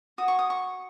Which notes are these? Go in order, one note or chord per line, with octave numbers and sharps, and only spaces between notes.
F#4 C#5 D#6
C#6
D#6
C#6